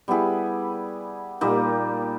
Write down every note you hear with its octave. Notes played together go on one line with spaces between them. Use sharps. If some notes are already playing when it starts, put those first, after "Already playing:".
G3 B3 E4 G#4
A#2 G3 A#3 D#4